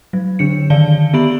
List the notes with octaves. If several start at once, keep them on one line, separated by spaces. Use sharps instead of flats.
F#3
D3 D4 C#7
D3 D#3 D5 F5 A5 G7
B3 G4 E5 B5 D7 F#7